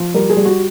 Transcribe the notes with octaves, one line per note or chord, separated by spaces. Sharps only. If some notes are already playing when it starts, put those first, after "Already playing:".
Already playing: F3
G3 A#4
G#4
G3
F#4